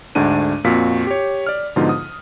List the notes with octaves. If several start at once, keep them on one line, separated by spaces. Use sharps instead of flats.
D2 G#2 A3 D4 D#7
F2 A#2 F#4 F5 B6
G4 C#5
D5 F6
G#2 B2 D3 F3 D#4 F4
D#6